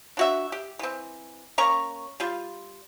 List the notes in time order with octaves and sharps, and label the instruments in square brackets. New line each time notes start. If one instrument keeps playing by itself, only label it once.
[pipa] D4 F#4 E5
G4
E3 C4
A#3 C#4 A#5 C#6
G3 F4